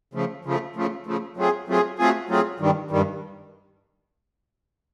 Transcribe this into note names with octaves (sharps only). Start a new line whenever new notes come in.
C#3 F3 A3
C#3 F3 A3
C#3 F3 A3
C#3 F3 A3
F#3 A3 C4 F4 G#4
F#3 A3 C4 F4 G#4
F#3 A3 C4 F4 G#4
F#3 A3 C4 F4 G#4
G2 D#3 G3
G2 D#3 G3